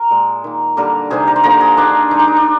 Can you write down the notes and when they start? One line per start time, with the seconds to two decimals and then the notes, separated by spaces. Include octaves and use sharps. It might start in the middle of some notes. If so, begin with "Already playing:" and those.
Already playing: A#4
0.10 A#2 G#3
0.44 D#3 A#3
0.77 D3 G3 A#3 A#4
1.10 C3 D#3 G3 G#4
1.27 A#4
1.36 C5
1.44 D3 F3 A#3 A#4
1.61 G#4
1.77 D#3 A#3 D4
2.11 D#3 G#3 D#4
2.19 D4
2.28 D#4
2.36 D4